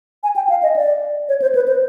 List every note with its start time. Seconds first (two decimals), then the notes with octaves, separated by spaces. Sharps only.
0.23 G#5
0.36 G5
0.49 F5
0.63 D#5
0.76 D5
1.29 C#5
1.42 C5
1.55 B4
1.68 C5